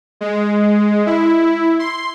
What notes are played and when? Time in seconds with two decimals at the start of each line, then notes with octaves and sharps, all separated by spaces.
0.21 G#3
1.06 E4
1.79 C6